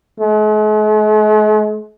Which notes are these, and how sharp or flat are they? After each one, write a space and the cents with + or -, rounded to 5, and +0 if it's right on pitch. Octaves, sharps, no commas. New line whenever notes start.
G#3 +45